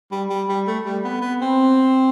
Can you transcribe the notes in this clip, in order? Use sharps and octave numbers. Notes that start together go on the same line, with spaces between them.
G3
G3
G3
A3
G3
B3
B3
C4